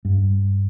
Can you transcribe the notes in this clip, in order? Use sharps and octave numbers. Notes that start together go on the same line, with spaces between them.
G2